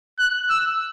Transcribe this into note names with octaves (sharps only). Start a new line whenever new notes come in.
F#6
E6